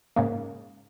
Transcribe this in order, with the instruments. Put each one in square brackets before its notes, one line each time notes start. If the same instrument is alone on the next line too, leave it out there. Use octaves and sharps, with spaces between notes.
[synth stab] G#2 C#3 A#3